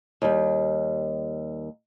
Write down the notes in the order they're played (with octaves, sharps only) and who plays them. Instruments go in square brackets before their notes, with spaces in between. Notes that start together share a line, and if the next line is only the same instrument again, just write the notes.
[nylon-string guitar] D#2 G3